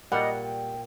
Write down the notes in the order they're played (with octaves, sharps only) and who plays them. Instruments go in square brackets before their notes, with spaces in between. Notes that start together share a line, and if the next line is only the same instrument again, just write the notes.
[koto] A#2 [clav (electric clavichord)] G3 [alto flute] D#5 [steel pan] F#5
[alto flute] G5